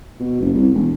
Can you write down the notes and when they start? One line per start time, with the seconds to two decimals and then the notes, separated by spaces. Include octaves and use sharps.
0.20 B2
0.40 F#1
0.54 C2
0.73 E1